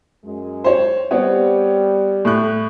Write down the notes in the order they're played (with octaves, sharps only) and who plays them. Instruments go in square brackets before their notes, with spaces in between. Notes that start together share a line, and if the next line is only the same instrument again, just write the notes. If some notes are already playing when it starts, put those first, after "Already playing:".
[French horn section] F#2 G#3
[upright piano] C5 C#5
[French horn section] G3 [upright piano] B3 C4 C#5
[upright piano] A2 F#6